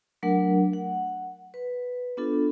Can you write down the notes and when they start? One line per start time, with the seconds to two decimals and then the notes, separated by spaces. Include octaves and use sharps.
0.23 F#3 A3 D4 A#4 F#5
0.73 F#5
1.54 B4
2.17 B3 D4 F4 A4